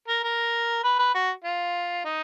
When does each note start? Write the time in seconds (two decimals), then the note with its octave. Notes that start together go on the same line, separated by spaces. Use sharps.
0.08 A#4
0.24 A#4
0.84 B4
0.99 B4
1.15 F#4
1.44 F4
2.05 D#4